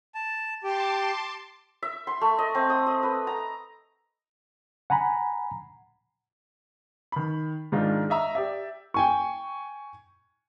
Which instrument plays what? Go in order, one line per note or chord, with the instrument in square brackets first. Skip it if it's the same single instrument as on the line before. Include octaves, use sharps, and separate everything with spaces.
[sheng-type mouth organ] A5
[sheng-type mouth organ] G4 [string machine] A5 C6 D6
[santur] E5
C6
A3
D#5
C4
D#6
D#5
B4
A#5
[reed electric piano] F#5 G#5 A#5 B5
[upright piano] D#3 B5
G#2 D#3 G#3 D4 D#4 F4
D#5 E5 A#5
G4 D5 E5
G5 G#5 C#6